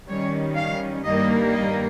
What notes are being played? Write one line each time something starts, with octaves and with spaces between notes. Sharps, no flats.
D#3 G3 C#4 C#5
F5
G2 D#3 G3 A#3 D#5
D#5